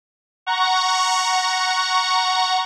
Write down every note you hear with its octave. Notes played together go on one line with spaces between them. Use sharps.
F#5 A#5 C#6